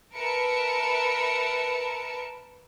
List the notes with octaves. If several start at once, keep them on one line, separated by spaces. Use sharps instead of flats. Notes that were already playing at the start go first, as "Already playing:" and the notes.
A#4 B4 E5 A5 C#7